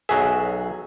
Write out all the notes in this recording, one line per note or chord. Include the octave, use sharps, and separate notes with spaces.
B1 F#3 G#4 E5